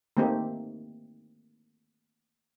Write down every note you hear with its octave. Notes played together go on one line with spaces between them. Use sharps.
D#3 A3 A#3 C4 D#4 G4